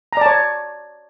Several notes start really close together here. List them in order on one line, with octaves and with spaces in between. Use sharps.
A#5 D5 A5 C#5